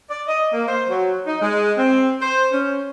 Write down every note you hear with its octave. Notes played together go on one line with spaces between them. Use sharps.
D5
D#5
A#3
C5
F#3
D#4
G#3
C4
C5
C#4